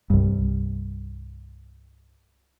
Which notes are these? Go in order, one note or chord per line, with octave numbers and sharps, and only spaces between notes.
C2 G2